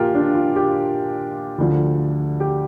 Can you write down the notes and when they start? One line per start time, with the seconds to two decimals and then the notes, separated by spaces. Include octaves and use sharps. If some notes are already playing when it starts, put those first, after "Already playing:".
Already playing: A#1 A#2 F4 G4 A#4
0.15 D4
0.35 F4
0.56 G4
1.58 D2 D3 F3
2.40 G4